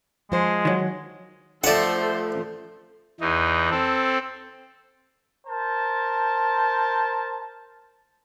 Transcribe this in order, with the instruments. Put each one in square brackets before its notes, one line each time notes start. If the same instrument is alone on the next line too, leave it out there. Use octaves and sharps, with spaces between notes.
[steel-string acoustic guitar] F3 C5 [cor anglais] G#3
[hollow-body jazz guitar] D#3 F#3
[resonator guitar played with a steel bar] F3 A3 [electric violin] A4 C5 [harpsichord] D5 F#5
[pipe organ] E2 E3 D#4
C4 A4
[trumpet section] A#4 C5 A5